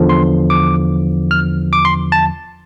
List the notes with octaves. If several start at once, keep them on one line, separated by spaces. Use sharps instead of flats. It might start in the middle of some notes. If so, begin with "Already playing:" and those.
Already playing: E2 D3 F3
C6
D6
F6
D6
C6
A5